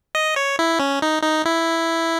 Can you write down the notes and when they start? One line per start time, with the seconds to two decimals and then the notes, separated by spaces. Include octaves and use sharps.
0.15 D#5
0.36 C#5
0.59 E4
0.80 C#4
1.02 D#4
1.23 D#4
1.45 E4